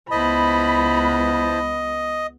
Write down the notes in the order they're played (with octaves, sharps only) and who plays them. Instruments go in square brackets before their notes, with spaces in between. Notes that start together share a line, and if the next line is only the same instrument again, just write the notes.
[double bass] C#2 B3 [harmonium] E4 C5 A5 [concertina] D#5 [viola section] B5